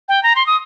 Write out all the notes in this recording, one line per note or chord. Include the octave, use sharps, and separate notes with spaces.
G5
A#5
C6
D#6